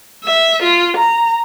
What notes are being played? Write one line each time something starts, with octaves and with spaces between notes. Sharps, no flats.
E5
F4
A#5